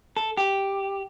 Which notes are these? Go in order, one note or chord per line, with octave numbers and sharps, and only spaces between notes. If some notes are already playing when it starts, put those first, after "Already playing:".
A4
G4